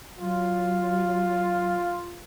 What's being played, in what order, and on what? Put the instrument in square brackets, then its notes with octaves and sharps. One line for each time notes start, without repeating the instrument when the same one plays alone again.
[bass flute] F#3 [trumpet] F4